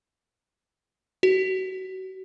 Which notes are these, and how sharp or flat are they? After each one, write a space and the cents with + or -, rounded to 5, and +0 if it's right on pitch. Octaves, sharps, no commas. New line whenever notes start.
F#4 +30